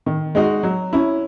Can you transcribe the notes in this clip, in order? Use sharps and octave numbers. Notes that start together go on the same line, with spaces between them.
D#3
G#3 D#4 F#4
F#3
C#4 E4